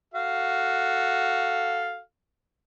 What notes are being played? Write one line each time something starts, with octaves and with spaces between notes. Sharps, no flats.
F#4 A4 F5